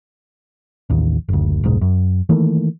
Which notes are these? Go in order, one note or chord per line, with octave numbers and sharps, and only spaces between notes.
A1 D#2
F#1 D2
F1 B1 G#2
F#2
D#3 E3 A3 A#3